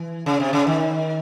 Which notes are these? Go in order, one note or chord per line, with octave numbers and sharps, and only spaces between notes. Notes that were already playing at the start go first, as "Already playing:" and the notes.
Already playing: E3
C#3
C3
C#3
D#3